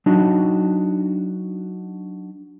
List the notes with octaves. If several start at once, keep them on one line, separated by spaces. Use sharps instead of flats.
F#3 D4 D#4 F#4